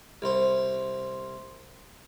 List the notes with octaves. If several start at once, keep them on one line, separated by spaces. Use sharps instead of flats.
C2 C5